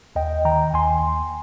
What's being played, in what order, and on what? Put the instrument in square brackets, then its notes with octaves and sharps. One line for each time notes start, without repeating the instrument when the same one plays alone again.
[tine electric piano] D#2 D#5 G5
D#3 G5 A#5
D#2 G#5 C6